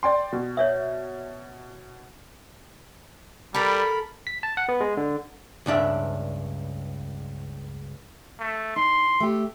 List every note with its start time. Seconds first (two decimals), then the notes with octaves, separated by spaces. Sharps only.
0.03 D5 G5 C6
0.32 B2
0.57 C#5 D5 E5
3.54 G3 A4 A#4 B5
4.27 B6
4.43 A5
4.57 F#5
4.69 B3
4.80 G#3
4.97 D3
5.66 C#2 G2 D4 E5
8.40 A3
8.76 D#4 C6
9.20 A3 G4